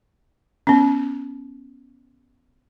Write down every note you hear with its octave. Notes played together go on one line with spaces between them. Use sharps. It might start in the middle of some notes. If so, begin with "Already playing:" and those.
B3 C#4